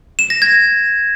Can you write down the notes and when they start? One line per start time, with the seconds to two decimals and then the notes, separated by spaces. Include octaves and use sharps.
0.19 E7
0.30 A#6
0.42 G#6